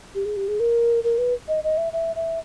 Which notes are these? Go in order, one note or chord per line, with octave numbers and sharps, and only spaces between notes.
G4
G#4
G4
G#4
A#4
A#4
B4
D#5
D#5
E5
E5
E5